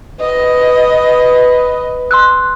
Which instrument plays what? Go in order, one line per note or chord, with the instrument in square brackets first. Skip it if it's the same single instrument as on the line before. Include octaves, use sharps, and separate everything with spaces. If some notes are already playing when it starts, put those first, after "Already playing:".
[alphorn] B4 [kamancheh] D#5
[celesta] C6 E6 F#6